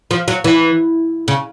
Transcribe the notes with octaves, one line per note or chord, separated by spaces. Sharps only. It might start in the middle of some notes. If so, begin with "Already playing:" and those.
F3
F#3
E3
C#3